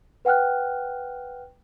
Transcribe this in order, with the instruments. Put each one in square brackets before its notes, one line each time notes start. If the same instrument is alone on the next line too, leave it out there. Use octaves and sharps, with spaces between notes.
[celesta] B4 F#5 G5 F6 F#6